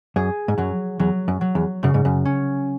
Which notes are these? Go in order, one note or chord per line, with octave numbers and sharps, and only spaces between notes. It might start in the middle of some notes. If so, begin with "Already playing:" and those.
F#2 G#4
G#2
F#2 F#3
E2 F#3
F#2
F#3
E2
F#2 C#3
G#2
F#2
C#4